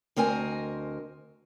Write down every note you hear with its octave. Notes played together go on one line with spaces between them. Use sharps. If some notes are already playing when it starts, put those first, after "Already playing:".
D2 C4 A#4 D#5 G#5